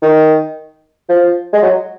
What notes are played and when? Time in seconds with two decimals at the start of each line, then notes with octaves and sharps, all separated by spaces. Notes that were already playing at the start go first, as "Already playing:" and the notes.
0.02 D#3
1.09 F3
1.53 G#3
1.63 F#3